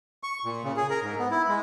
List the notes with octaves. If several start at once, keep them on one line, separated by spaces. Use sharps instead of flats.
C#6
A#2
C#3
G#4
A#4
G#2
B3
E4
G#3